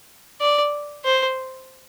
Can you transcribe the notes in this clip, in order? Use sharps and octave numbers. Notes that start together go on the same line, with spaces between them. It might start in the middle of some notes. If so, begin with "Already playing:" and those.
D5
C5